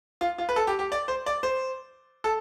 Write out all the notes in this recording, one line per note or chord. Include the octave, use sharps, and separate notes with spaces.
F4
F4
B4
A4
G4
G4
D5
C5
D5
C5
A4